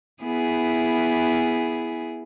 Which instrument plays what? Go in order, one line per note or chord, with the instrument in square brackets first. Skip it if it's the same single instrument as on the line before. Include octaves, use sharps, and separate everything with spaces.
[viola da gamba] B3 E4 G#4